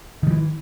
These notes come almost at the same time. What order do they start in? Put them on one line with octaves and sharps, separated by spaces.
D#3 G3 E3